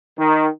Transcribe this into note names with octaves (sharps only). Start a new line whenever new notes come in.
D#3